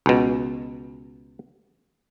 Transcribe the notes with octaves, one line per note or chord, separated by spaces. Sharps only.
C#2 B2